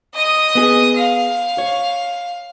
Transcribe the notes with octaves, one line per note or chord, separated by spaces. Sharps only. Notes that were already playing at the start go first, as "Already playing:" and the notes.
D#5 D#6
B3 G#4
F5
C#5